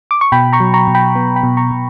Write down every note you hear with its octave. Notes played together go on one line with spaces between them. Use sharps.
D6
C#6
B2 G5 B5
A#5 C#6
F#3
A#5 C#6
B2
G5 B5
B3
G5 B5
B2
A#5 C#6
B2